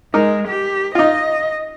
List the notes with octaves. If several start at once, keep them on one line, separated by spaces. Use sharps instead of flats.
G#3 D#4 A#4
G4
D#4 F4 D#5